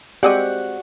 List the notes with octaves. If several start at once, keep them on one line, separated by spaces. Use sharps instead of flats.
G#3 C4 F#4 G4 D5 D#5 F#5